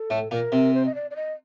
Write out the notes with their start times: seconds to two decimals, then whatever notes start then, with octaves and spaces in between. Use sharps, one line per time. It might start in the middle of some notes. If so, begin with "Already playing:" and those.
Already playing: A4
0.10 A2 A3
0.31 A#2 A#3 A#4
0.52 C3 C4
0.74 C5
0.86 D#5
0.95 D5
1.11 D5
1.16 D#5